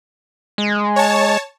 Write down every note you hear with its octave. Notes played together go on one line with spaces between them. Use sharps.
G#3
C#5 A5